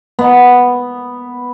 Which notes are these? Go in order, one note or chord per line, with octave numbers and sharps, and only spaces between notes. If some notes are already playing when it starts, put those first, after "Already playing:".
B3